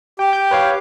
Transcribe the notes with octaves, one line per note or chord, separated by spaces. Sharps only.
G4 G5
G6
B4 C#5 F5